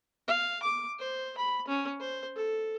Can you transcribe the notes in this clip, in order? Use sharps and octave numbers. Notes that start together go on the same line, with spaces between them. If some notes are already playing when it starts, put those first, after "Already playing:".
F5
D6
C5
B5
C#4
C5
A4